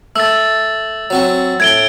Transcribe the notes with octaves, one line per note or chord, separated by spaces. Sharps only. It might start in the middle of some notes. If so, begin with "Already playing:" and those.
A3 E6 A6
F#3 C4 F#4
A2 G#6 D7 G7